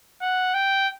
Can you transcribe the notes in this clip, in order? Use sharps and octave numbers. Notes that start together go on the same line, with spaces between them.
F#5
G5